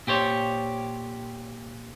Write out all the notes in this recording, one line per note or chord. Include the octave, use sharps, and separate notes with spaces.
A#2 G4 C5 C#5